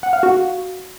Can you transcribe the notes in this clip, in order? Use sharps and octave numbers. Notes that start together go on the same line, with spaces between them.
F#5
F5
F#4